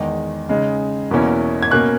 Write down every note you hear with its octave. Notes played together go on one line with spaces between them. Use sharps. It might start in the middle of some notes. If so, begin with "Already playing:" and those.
Already playing: E2 D#3 G#3 D#4
C#3 G#3 D#4
E2 B2 A#3 C#4 E4
G#6
B2 A#3 C#4 F#6